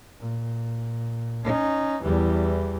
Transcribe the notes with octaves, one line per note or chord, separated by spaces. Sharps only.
A#2
C#4 D#4
E2 E3 G3